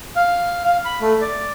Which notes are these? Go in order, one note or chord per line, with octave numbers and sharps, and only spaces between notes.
F5
F5
B5
A3
D5